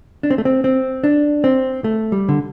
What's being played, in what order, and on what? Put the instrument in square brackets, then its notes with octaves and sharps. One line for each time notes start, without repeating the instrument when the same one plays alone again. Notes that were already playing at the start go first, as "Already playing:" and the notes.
[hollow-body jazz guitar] D4
C4
A3
C4
C4
D4
C4
A3
G3
D3